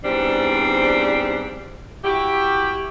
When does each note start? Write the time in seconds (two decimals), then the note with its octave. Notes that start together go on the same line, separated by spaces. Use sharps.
0.04 E2 G#2 G3 C4 D4
2.04 E4 F#4 G4